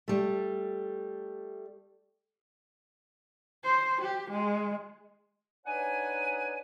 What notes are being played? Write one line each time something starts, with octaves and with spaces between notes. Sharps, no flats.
G3 A3
C5
G4
G#3
D4 D#4 B4 C#5 F#5 G#5